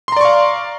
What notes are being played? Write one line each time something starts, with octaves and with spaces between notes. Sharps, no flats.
D5 F5 A#5 C6 C#6